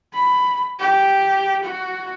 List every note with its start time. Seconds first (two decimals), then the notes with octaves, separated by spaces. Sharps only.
0.13 B5
0.79 G4
1.63 F#4